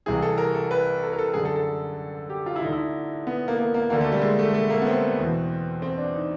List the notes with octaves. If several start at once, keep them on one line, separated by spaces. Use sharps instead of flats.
C2 C3 E3 G#4
A4
A#4
A4
B4
A4
A#4
A4
F#2 D3 G#4
A4
A4
G4
F4
E4
D2 D3 D#4
E4
B3
A#3
A#3
A#3
D2 D3 A#3
A3
G3
G#3
A3
A3
A#3
B3
C4
E2 B2
C4
D4
D#4